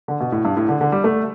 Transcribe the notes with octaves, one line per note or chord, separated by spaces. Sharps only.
D3
B2
A2
G2
A2
D3
D3
G3
A3